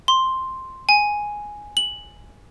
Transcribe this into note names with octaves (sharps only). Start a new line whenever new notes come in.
C6
G#5
F#7